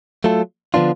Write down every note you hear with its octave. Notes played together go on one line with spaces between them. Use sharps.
F#3 A3 F4 A4
D3 F3 B3 D4 F4